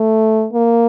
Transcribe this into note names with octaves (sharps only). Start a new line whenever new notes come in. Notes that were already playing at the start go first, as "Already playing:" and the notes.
Already playing: A3
A#3